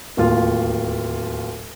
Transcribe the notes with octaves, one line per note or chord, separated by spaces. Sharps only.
D1 D#2 F4